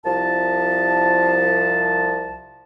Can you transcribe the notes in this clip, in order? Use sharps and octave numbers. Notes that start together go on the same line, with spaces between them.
C2 F3 A5